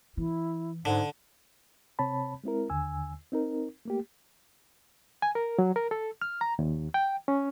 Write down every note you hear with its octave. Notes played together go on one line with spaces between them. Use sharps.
E3 E4
G#2 D3 F#5
C3 C4 C#5 A5 B5
G#3 C4 E4 A#4
D#2 D3 G#5 E6
C4 D#4 A#4
A3 A#3 G4
G#5
A#4
F#3
A#4
A4
F6
A#5
D#2
G5
C#4